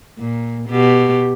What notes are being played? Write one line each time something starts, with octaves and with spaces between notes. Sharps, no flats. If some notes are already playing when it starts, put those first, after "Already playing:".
A#2
B2 G4